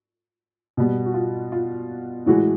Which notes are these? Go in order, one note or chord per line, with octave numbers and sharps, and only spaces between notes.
B2 G3 B3
F#4
F4
F4
A2 E3 G#3 F#4